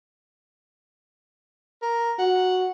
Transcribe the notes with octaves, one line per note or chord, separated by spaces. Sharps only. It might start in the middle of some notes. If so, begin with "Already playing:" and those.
A#4
F#4 F#5